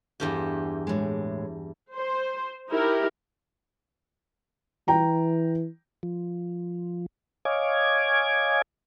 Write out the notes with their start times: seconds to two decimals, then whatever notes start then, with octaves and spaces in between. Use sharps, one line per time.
0.20 E2 G2 G4
0.87 A2 G#3
1.94 C5
2.70 D#4 E4 G4 A#4
4.88 E3 G5 A#5
6.03 F3
7.45 C#5 D#5 F5 G#5 D6 G#6